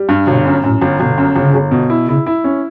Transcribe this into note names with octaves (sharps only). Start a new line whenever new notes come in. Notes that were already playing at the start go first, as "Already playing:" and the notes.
Already playing: G3
G2
G1 B2
F#2
F#2 A2
G1
G1 B2
F#2
G1 C#3
G1
B2
E4
C#3 E4
E4
C#4